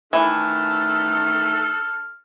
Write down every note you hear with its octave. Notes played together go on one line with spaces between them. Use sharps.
D#3 E3 A3 D4 A4 F6